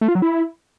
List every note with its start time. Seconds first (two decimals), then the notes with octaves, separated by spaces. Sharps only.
0.01 A3
0.08 F4
0.15 F#3
0.22 E4